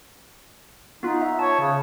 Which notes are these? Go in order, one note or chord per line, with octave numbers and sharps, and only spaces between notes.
B3 D#4 F4
E5
C#5 A5
C#3